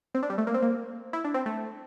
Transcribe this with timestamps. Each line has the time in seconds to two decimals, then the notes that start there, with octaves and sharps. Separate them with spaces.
0.14 C4
0.23 D4
0.30 G3
0.38 A3
0.47 A#3
0.54 C4
0.62 A#3
1.13 E4
1.24 D4
1.34 C4
1.46 A3